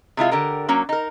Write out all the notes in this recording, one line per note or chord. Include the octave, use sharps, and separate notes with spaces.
C3 G#3 E4 F4
D3 G4 A#4
F#3 A#3 C#4
D#4 A#4